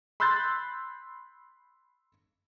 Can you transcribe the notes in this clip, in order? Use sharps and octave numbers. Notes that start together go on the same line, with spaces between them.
B5 C6 E6 F#6 G6 A6